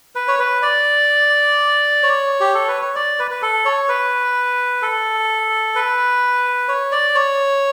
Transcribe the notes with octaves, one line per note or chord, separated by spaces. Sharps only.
B4
C#5
B4
D5
C#5
G4
A4
B4
C#5
D5
B4
B4
A4
C#5
B4
A4
B4
C#5
D5
C#5